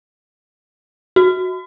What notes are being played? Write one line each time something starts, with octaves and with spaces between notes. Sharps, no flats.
F#4